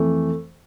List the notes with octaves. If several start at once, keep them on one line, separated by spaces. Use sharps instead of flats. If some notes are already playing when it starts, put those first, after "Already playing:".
Already playing: F2 E3 A3